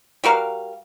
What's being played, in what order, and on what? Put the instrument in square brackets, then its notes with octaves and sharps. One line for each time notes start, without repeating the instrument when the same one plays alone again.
[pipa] G3 F#4 A#4 F5